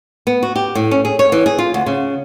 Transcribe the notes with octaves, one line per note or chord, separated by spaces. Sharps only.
B3
F#4
G4
A2
C#4
G#4
C#5
E3
G#4
F4
D2
C#3